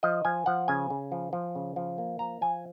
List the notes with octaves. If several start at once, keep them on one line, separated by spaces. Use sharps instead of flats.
F3 D#5
F3 G#5
F3 F#5
C#3 G#5
C#3
F3
F3
C#3
F3
A#3
F3 A#5
F3 G#5